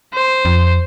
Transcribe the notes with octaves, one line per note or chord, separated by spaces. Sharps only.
C5
F2